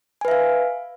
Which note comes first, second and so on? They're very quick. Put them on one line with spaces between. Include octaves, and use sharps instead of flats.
G#5 B4 E5 F5